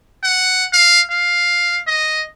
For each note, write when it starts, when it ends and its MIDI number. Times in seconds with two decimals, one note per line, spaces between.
0.23 0.65 78
0.73 1.01 77
1.10 1.79 77
1.87 2.23 75